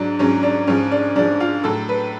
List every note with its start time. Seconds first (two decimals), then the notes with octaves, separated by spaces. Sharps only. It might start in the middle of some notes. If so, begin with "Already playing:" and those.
Already playing: G#2 F#3 D4
0.19 G#2 F#3 C#4
0.43 D4
0.67 G#2 F3 C#4
0.91 D4
1.16 G#2 F3 D4
1.40 F4
1.64 A2 F#3 A4
1.89 B4